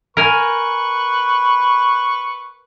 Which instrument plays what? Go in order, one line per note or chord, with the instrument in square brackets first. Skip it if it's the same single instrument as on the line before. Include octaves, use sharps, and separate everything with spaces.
[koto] A#4 G#5 [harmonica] B4 C#6